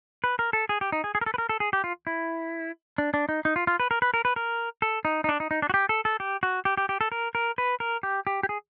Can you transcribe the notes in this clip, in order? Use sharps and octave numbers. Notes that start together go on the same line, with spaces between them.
B4
A#4
A4
G#4
G4
D#4
G#4
G#4
A#4
A4
B4
A#4
A4
G#4
G4
F4
E4
D4
D4
D#4
D#4
F4
F4
B4
A#4
B4
A#4
B4
A#4
A4
D#4
D#4
D4
D#4
D#4
D4
F#4
G4
A4
A4
G4
F#4
G4
G4
G4
A4
A#4
A#4
B4
A#4
G4
G4
G4
G#4